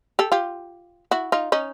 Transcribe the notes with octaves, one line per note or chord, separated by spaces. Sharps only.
G4 A4
F4 G4
E4 F#4
D#4 F4
C#4 D#4